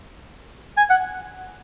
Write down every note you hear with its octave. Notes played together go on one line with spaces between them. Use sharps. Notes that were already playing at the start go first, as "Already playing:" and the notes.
G#5
F#5